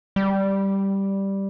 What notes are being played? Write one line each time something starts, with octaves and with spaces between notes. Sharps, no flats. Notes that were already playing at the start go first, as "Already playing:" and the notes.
G3